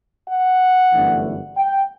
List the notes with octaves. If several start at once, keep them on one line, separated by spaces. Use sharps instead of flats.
F#5
G1 F#2 E3 A3 D4
G5